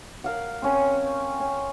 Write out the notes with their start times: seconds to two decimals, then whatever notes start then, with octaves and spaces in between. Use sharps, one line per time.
0.24 A#4 F5 F#5
0.62 C4 C#4
1.40 C#4